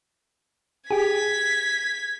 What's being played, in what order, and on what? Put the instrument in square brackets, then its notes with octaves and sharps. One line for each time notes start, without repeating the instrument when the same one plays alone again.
[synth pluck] G4 G#4 [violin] G#6 B6